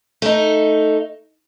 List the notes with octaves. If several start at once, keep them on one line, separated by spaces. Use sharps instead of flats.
A3 D#4